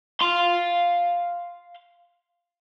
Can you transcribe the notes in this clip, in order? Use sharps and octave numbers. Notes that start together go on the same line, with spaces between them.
F5 C6